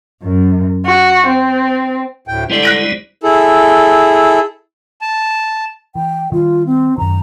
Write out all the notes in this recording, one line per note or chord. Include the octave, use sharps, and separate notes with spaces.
F#2
F#4
C4
D2 A2 G5
D3 G3 G#3 E4 G4 C5 D5
F#6 A#6 D7
E4 G#4 A4
A5
E3 G5
D#3 G3 F4
C4
F#2 D#3 A#5